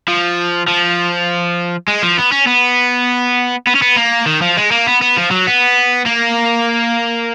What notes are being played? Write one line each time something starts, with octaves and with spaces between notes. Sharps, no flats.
F3
F3
G#3
F3
B3
C#4
B3
B3
C#4
B3
A#3
D#3
F3
G#3
A#3
B3
B3
F3
F#3
B3
A#3